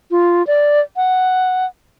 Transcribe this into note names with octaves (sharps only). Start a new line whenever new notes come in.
F4
D5
F#5